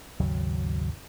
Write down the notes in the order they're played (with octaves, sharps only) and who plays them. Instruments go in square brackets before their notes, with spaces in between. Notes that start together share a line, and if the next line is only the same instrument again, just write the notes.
[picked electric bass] G#1 D#2 C#3 F#3